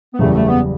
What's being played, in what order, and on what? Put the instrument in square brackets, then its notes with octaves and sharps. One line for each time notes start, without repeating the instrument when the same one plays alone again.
[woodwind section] B3
[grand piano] F#1 E2 C#3 G3 [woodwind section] A3
[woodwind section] A3
B3